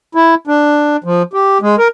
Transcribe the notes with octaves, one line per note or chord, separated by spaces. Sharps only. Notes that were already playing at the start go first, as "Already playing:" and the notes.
E4
D4
F3
G4
G#3
A#4